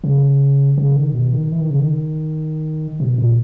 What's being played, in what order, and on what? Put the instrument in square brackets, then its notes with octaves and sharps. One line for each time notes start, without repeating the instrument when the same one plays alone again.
[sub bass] C#3
C#3
D#3
B2
D#3
E3
D#3
C#3
D#3
B2
A#2